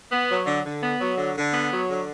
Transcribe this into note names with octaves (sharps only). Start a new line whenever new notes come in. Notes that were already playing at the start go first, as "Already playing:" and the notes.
B3
F#3
D3
D3
B3
F#3
D3
D3
B3
F#3
D3